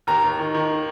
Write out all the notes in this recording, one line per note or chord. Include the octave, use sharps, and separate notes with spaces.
D#2 A#5
D#2
D#3
D#3